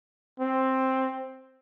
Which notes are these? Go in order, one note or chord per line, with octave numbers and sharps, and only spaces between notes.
C4